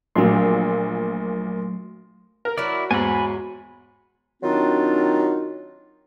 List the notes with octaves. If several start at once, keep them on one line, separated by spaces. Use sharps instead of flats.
A#1 A#2 F#3 A3 C6
A#4
F#3 E4 F#4 D5 E5
E2 G#2 G#5 B5
D#3 F#3 C4 D4 D#4 F4